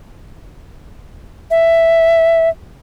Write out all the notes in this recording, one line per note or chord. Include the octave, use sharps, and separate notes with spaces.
E5